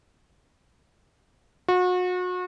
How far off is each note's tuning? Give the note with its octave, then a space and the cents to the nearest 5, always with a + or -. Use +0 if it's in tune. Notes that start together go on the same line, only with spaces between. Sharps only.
F#4 -35